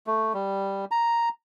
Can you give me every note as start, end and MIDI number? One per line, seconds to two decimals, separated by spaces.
0.07 0.33 57
0.34 0.85 55
0.91 1.29 82